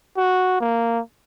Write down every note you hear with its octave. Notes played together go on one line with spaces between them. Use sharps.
F#4
A#3